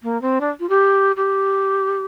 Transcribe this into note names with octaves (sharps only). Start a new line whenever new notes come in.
A#3
C4
D4
F4
G4
G4